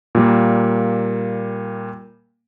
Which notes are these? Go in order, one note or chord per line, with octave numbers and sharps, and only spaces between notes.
A#2 G3 A#3